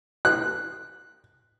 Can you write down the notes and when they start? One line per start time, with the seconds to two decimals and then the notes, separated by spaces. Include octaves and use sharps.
0.25 F#6